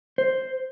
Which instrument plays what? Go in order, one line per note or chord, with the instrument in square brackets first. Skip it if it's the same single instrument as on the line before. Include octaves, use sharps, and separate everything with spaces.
[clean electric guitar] C5